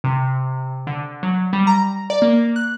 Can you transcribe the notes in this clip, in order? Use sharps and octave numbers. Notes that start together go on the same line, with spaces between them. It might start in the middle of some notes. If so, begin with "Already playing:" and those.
C3
D3
F#3
G3
A#5
D5
A#3
F#6